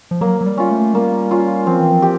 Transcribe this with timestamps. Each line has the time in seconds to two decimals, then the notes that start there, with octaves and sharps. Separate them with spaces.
0.11 F3
0.21 F#3 A#3
0.41 F#3
0.46 G3
0.58 C#4 F4
0.71 A3
0.94 G3 A#3
1.31 C#4 F4
1.67 F3 C4
1.80 E3
1.92 F3
2.02 G4